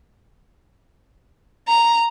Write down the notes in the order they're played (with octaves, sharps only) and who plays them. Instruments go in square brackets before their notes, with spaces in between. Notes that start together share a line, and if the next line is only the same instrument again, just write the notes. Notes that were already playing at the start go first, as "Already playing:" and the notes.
[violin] A#5